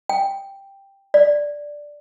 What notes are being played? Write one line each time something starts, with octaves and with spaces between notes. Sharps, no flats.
G5
D5